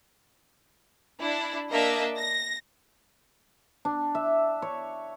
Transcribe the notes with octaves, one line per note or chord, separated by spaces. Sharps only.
D4 E4
A#3 D4 D#5 E5
A#6
D4
E5
C#5